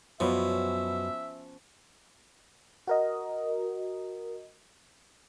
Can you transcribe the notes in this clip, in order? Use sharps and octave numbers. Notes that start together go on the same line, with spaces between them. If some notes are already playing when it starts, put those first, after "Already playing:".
F#2 B2 F3 B3 C#4 E5
F#4 A#4 D#5